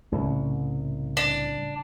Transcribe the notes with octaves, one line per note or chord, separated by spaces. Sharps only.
C2 A2 C#3
D4